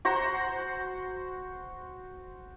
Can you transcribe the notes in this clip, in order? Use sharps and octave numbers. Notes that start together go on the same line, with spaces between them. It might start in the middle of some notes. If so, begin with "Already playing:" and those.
F#4 C5 A#5